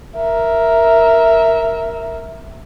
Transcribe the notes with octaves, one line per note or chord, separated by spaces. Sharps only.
A#4 E5